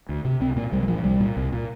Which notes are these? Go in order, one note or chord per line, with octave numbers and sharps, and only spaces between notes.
D2
C3
C2 C4
A#2 A#3
C2 G3
G3
A#2 F3
C2 G3
A#2
C2
A#2